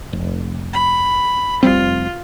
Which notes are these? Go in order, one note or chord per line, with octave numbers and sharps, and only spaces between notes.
F1
B5
F1 G3 C4 F4